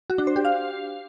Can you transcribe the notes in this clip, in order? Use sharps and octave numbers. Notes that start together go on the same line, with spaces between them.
F#4
D4
C5
G4
F5